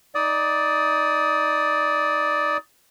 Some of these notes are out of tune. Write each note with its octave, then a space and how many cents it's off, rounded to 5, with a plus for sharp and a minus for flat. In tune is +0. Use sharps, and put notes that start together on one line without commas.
D#4 +15 D5 +0 D#6 +20